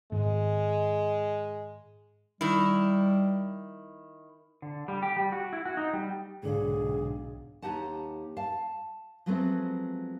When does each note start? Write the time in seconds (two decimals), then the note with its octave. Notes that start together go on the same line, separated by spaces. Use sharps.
0.12 G#2 D#3 G#3
2.41 D#3 G3 E4
4.62 D3
4.88 G3
5.02 G4
5.17 G3
5.32 F#4
5.53 E4
5.66 F#4
5.77 D#4
5.93 G3
6.43 B1 G#2 D3 G#3 D4 G#4 F5
7.62 D#2 A#3 D#4 G4 F#5 A5
8.37 F5 A5
9.26 F3 F#3 G#3 A3 B3 C4